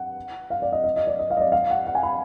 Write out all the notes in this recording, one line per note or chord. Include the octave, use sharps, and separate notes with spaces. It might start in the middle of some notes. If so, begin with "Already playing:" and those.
Already playing: F#5
F5
D5
D#5
D#5
D#5
D5
D#5
F5
D#5
D5
F5
F#5
F#5
G#5
B5